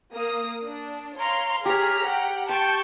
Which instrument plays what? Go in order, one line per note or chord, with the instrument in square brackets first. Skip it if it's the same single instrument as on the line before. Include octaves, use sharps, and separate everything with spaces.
[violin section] A#3 D#6
D4
[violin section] C#5 F5 C6 [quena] A#5
[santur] G4 C#5 [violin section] G#4 F6 B6 [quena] A#5
[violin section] F#5 G5
[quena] G5 [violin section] A5 C#6 G6 [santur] C6